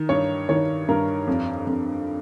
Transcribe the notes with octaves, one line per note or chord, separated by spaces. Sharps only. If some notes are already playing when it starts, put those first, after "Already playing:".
Already playing: D#3
G2 C#5
D#3 C#5
G2 A#4
F2
F2